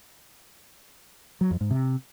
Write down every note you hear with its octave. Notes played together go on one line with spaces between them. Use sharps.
F#3
F2
G#2
C3